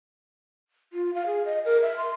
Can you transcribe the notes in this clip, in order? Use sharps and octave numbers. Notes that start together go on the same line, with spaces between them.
F4
F5
G#4
D#5
A#4
E5
C6